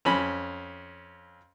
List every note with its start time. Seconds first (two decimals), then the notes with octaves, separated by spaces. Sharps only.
0.05 F2 C#4 B5